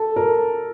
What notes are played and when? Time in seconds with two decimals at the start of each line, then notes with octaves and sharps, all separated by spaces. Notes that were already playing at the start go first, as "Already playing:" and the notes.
Already playing: A4
0.16 A#4